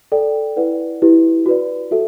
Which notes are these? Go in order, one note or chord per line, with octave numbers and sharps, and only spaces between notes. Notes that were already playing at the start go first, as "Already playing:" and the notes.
A4 D5 G5
E4 B4 D5 F#5
E4 G4 B4
F#4 B4 D5
F#4 A4 E5